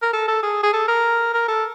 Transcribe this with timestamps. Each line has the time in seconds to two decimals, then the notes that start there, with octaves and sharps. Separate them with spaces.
0.02 A#4
0.13 A4
0.28 A4
0.43 G#4
0.63 G#4
0.73 A4
0.88 A#4
1.34 A#4
1.48 A4